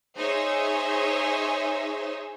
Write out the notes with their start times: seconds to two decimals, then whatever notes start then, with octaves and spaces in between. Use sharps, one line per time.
0.17 D#4 G#4 C5 C#5 E5